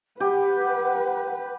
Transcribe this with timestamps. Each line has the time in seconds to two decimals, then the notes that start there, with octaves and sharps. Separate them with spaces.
0.20 G4 B4 F#5